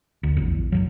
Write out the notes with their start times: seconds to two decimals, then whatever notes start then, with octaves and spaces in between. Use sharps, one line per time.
0.23 D2
0.37 A#1 E2
0.72 F#1 D#2 F#3